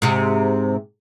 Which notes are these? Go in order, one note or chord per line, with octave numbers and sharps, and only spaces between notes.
G#2 C3